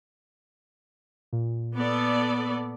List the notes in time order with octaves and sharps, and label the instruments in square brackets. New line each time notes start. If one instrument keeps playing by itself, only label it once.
[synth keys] A#2
[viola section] B3 A4 D5